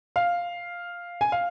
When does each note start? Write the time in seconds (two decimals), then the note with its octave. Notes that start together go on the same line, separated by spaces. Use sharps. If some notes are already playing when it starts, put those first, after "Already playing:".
0.16 F5
1.21 G#5
1.32 F5